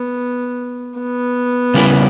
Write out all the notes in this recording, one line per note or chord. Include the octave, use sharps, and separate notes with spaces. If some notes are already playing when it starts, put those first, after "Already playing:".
Already playing: B3
B3
C#3 G3 C#4 E4 A#4